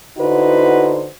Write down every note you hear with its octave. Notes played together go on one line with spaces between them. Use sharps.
D3 D#4 E4 F#4 B4 C5